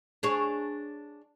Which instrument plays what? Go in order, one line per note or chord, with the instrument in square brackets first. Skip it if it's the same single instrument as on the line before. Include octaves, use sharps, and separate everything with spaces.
[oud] D4 G#4 C#5